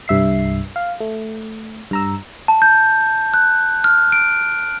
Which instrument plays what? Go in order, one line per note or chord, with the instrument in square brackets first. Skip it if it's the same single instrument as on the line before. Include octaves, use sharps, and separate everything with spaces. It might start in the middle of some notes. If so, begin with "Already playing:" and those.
[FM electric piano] C2 G2 E5 C7
F5
A3
G2 A#5 E6
[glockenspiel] A5
G6
F#6
F6
D7